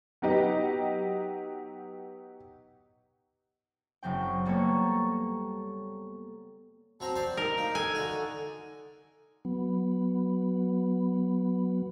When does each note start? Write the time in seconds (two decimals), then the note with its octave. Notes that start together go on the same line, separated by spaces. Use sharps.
0.22 F#3 B3 D#4 G4 D#5
4.03 F#1 F#3 C4 G5
4.45 G3 A#3 B3 A4 C#5
7.00 F#3 C4 A5 A#5
7.15 C5 D5 D6
7.37 D#4 A#4
7.58 A#3
7.75 A4 G#5
7.95 D3 F#4
9.45 F#3 B3